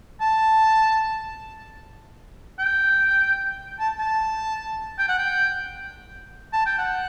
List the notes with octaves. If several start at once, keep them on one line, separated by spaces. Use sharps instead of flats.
A5
G5
A5
A5
G5
F#5
G5
A5
G5
F#5